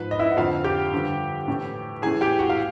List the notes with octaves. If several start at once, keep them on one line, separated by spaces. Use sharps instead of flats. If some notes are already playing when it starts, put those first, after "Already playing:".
Already playing: G#2 F3 B4 B5
D#5
E4 E5
F#5
F2 D3 F3 F4 F5
G4 G5
G2 D3 F3
A2 E3
A2 E3 G#4 G#5
G4 G5
F#4 F#5
F5